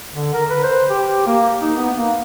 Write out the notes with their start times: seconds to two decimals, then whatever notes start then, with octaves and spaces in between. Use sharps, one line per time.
0.13 D3
0.34 A#4
0.50 B4
0.63 C5
0.90 G4
1.27 A#3
1.62 D#4
1.77 B3
1.97 A#3